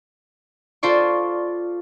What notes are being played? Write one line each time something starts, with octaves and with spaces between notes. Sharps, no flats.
F4 A4 C5 D5 C#6